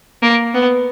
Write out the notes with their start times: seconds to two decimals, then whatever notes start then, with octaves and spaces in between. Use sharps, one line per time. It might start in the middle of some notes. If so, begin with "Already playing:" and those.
0.23 A#3
0.54 B3